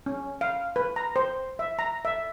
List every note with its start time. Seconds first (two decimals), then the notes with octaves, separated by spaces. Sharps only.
0.06 C#4
0.41 F5
0.76 B4
0.96 A#5
1.16 C5
1.59 E5
1.79 A#5
2.05 E5